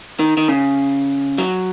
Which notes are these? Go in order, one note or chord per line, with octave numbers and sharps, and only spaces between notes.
D#3
D#3
C#3
F#3